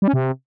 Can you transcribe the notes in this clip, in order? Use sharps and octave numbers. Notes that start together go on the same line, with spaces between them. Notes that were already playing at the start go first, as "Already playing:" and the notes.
G3
C#4
C3